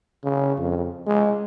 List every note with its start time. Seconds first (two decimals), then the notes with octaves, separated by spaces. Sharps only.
0.24 C#3
0.58 F2
1.06 G#3